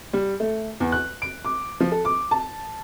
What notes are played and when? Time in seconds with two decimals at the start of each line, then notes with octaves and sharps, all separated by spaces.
0.13 G3
0.40 A3
0.80 E2
0.92 F#6
1.22 D7
1.45 D6
1.80 F3
1.92 A4
2.05 D6
2.31 A5